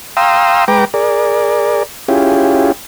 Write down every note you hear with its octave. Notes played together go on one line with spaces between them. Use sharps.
F5 G5 A#5 C6 D#6 E6
G#3 B4 G5 A#5 D6
G#4 A#4 D5
C#4 E4 F4 G4 G#4